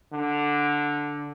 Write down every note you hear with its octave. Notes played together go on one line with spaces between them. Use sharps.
D3